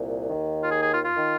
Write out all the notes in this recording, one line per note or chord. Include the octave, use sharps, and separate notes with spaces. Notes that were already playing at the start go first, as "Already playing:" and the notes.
Already playing: C2 A#2
D#2 D#3
F4
G#4
G#4
F4
F4
D#3